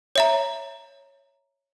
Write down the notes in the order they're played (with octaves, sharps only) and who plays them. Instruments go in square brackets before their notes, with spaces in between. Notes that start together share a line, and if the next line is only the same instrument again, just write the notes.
[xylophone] C#5 E5 A#5